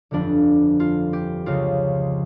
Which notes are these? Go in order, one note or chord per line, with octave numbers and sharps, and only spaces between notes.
G1 F2 D3 F3 D4
F4
G4
C#2 C#3 F3 F4